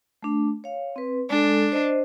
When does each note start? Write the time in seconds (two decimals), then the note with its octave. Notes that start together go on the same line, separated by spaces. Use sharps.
0.22 A3 D4
0.64 C#5 F5
0.96 C4 B4
1.30 G#3 D4 A4
1.72 C5 D#5